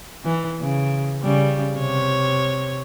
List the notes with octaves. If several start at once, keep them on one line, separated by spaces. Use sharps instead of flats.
E3
C#3
C#3 G3
C3 C#5